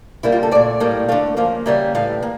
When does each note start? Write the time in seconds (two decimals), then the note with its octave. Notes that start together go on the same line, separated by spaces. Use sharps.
0.23 C#3 G3 A#3 E4
0.32 F4
0.43 A4
0.51 A#2 A3 D5
0.80 A2 G3 A#3
1.08 D3 A3 F5
1.37 C#3 F3 A#3 F5
1.66 C#3 G3 A#3 E5
1.95 A2 E3 G3 F5
2.23 A#3